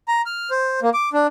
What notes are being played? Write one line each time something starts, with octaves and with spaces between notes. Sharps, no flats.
A#5
F6
C5
A#3
D6
D4